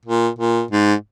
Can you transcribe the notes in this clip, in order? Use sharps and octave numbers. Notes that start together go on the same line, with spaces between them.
A#2
A#2
G#2